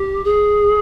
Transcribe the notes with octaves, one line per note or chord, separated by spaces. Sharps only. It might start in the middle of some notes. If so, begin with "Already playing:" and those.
Already playing: G4
G#4